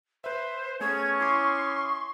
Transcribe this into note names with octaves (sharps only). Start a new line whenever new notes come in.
B4 C5 E5
A3 B3 C#4 G#4 C#6 G#6
E4 C6 D6 D#6